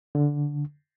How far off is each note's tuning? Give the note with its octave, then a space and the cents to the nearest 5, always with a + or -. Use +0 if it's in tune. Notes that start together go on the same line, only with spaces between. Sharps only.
D3 -10